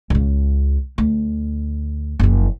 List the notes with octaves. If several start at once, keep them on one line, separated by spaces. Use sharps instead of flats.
C#2 C#3
D2
F#1 F3